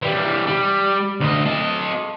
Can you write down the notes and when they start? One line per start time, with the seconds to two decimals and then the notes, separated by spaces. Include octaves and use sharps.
0.02 E3 G3
0.48 G3
1.20 D2 D#5
1.46 A4 D#5